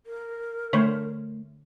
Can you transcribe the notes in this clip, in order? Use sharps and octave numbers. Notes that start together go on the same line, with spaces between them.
A#4
D3 A3 C5 C#5